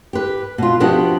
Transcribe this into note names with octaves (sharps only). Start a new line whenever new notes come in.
G4 B4
B2 F4
F3 B3 D4 F#4 G4 D#5